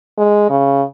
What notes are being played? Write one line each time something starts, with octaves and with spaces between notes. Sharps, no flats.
G#3
C#3